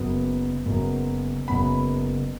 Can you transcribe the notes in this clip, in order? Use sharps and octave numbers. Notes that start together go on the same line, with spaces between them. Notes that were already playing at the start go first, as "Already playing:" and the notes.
Already playing: F#1 F#2 F#3 B3
F#1 F#2 F#3 B3
F#1 F#2 F#3 B3 B5